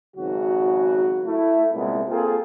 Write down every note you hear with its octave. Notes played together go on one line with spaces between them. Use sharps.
G#1 C#3 F#3 F#4
A3 E4
C2 A#2 G#3 B3 E4
A#3 C4 F4 G#4 A4